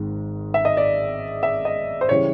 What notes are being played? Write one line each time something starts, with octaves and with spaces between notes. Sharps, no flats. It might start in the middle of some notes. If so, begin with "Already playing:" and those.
Already playing: G#1 G#2 D#3 G#3
E5
D#5
D5
E5
D#5
C5
C#3 E3 G3 C#5